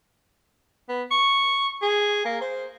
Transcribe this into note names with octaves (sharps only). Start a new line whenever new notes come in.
B3
C#6
G#4
A#3
C5